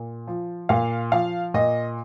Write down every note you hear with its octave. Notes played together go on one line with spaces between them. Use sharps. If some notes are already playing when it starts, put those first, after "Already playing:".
Already playing: A#2
F3
A#2 F5
F3 F5
A#2 D#5